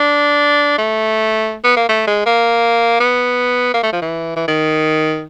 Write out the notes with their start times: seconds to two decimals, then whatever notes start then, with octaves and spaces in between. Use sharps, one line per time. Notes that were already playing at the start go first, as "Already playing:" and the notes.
Already playing: D4
0.78 A3
1.64 B3
1.77 A#3
1.89 A3
2.07 G#3
2.26 A#3
3.00 B3
3.74 A#3
3.83 A3
3.92 F3
4.02 E3
4.36 E3
4.48 D#3